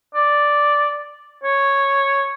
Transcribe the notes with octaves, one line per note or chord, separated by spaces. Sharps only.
D5
C#5